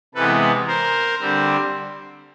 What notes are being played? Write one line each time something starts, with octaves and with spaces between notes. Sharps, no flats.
C3 E3 G#3 B3 A4 B4
A#4 C5
D3 G3 C4